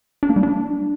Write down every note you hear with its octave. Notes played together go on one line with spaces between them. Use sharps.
D4
A#3
G3
D4